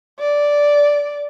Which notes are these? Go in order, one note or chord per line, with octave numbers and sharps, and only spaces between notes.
D5